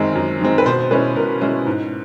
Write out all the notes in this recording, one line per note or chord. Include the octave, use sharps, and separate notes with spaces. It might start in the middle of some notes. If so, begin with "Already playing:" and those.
Already playing: F#2 D#3 G#3 C4
F#2
D#3 G#3 C4
B4
B2 C5
G#3 C#4 E4 B4
B2 A#4
G#3 C#4 E4
G#2